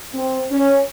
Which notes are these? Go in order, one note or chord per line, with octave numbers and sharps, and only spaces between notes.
C4
C#4